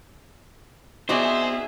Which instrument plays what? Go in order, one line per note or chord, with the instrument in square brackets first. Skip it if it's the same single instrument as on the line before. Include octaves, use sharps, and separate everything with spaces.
[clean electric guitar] B3 C4 [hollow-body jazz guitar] D#4 F#4 D5 [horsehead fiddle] G#4 E5 [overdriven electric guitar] C5